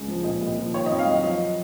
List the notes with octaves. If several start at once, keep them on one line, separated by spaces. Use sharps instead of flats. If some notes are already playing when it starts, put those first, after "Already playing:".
Already playing: C#2 C#3
F3
A#2 D#5
C2
F3
D#3 C#5
F2 D#5
F5
F#3 D#5
F3 D#5